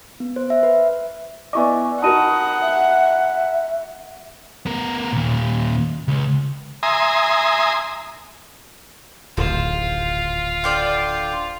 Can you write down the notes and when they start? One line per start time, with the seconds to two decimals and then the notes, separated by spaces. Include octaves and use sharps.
0.20 B3
0.36 C5
0.50 E5
0.63 B4
1.53 B3 E4 D5 D#5 G#5 C#6 D6
2.02 D#4 F#4 A#4 F#5 A5 B5 D#6 D#7
2.62 E5
4.66 B3 A#4
5.13 D#2 A#2
6.08 C#2
6.83 E5 G#5 A#5 C6 D#6
9.37 D1 G#1 F4 C5
10.64 D3 C5 D5 F5 G5 C6